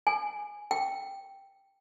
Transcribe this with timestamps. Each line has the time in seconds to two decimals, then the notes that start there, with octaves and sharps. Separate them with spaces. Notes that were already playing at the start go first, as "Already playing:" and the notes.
0.07 G#5
0.71 G5